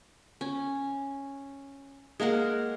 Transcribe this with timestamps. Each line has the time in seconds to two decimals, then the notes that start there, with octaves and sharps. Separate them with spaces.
0.41 C#4
2.20 G#3 A#3 A#4 F#5